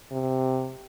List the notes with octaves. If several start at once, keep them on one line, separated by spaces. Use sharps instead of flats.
C3